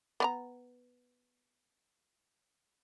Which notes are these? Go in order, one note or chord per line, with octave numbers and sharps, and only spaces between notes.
B3 D5 A#5